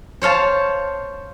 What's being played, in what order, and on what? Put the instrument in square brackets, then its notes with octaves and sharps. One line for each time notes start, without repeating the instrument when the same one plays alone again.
[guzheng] C5 C#5 F5 A5